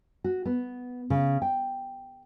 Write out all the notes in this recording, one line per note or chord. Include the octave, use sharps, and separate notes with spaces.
F#4
B3
C#3
G5